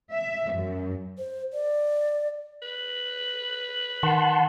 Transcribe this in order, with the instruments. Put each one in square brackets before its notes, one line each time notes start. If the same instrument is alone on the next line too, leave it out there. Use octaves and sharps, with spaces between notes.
[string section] E5
F#2
[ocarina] C5
D5
[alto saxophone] B4
[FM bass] D#3 [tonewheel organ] F#5 A5 C6